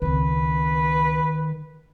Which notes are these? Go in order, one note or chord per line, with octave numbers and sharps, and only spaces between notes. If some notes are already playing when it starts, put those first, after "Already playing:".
C#2 D#3 C4 B4